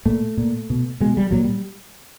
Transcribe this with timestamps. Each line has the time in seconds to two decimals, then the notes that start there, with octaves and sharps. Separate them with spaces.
0.05 A#2 A3
0.37 A#2
0.70 B2
1.00 B2 G#3
1.17 G3
1.31 A#2 F#3
1.44 G3